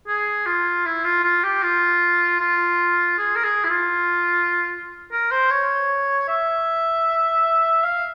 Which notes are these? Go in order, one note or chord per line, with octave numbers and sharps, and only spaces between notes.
G#4
F4
E4
F4
F4
G4
F4
F4
G#4
A#4
G#4
E4
F4
A#4
C5
C#5
E5
F5